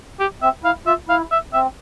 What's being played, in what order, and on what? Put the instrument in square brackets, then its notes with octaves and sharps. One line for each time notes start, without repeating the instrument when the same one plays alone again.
[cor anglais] G4
[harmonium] C4 [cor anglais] E5
[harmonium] E4 [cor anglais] F5
[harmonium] F4 [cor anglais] E5
[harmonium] E4 [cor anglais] F5
[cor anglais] E5
[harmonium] C4 [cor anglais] E5